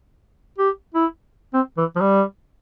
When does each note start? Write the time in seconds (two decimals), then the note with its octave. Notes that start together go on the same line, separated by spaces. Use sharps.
0.58 G4
0.94 E4
1.53 C4
1.77 E3
1.96 F3
2.00 G3